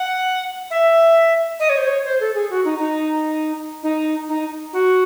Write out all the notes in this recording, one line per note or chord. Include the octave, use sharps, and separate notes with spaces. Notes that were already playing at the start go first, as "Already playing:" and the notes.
Already playing: F#5
E5
D#5
C#5
C5
C#5
C5
A4
G#4
F#4
D#4
D#4
D#4
D#4
F#4